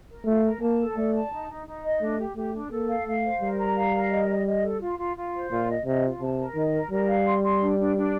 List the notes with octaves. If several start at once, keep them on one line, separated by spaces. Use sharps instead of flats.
A#4
A3 F4
A#4
A#3 A5
A4
A3 D5
A5
D#4
D#4
D#4
D#5
A3 D4
G4
A3 G4
D4
A#3 A4
F5
A3 F5
C5
G3 A#4
A#5
F5
A#4
D#5
D#5
D#5
A4
F4
F4
F4
C5
A#2 F4
D#5
C3 D#5
F4
C3 A5
A#4
D#3 D#5
A#4
G3 A#4
F5
C6
C6
D4
D4
D4